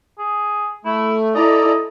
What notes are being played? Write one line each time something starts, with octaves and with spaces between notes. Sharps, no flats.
G#4
A3 E4
E4 A4 D5 D#5 A#5